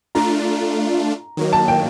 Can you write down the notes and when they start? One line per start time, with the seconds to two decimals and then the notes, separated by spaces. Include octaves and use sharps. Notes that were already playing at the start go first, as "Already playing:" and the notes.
0.15 A3 D4 F4 A#5
1.37 D#3 F#3 A#3
1.53 A5
1.68 G5